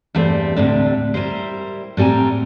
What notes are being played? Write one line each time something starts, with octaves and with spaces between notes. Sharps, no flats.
E2 G2 G3 A3 C4
D2 A2 C3 D4
G3 E4 A#4 C5
A2 G3 C4 G#5 A#5